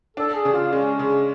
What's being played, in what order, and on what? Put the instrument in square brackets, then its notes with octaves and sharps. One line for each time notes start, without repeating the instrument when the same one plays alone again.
[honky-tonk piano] D4 [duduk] A4
[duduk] G#4
[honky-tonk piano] C#3
[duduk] F4
[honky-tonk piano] G#3 [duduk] C#4
[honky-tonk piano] C#3